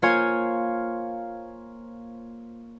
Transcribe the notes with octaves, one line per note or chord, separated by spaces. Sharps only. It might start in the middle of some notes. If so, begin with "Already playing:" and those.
A#3 F4 C5 C#5 F5 G#5